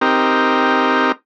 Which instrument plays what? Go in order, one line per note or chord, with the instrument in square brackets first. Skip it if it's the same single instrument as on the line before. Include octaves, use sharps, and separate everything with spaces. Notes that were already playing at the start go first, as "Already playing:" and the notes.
[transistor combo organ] C4 D#4 G4 A#4